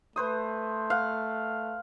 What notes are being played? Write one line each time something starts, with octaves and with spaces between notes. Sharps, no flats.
A3 B4 C5 D#6
F5 F#5